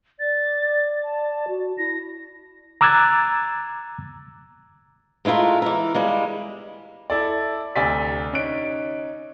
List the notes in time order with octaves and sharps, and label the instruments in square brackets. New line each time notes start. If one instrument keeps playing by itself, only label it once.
[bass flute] D5 [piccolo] A6
[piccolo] A5
[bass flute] F#4
[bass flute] E4 [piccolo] A#6
[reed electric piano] A#5 D6 E6 F#6 G#6 A6
[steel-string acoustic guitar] G#3 A3 E4 F4 A#4
E3 A#4
G3 G#3 A#3
[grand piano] E4 A4 D5
D2 C3 D5 G#5 B6
C#4 D#4 F#6 D7